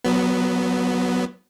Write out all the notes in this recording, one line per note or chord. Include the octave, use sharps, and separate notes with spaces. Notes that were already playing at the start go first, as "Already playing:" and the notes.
F#3 B3